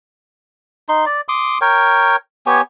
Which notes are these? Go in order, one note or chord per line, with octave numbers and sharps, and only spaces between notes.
D#4 C6
D5
C6 D6 D#6
A#4 C#5 G5
B3 G4 C#5 G#5